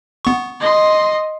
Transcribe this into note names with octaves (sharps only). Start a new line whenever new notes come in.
B3 C#6
D#5 C6